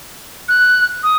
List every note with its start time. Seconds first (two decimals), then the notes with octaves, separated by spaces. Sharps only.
0.49 F#6
1.03 D#6